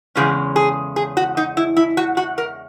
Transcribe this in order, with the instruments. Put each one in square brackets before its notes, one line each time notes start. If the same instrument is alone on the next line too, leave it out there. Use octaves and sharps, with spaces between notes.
[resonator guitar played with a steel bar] E2 C#3 G#3 C#4 G#4
G#4
G#4
F#4
D#4
E4
E4
F#4
F#4
A#4